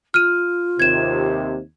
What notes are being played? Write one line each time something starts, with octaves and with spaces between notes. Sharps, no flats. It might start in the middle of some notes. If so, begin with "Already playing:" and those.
F4 F6 D#7
D#2 C3 G#6 E7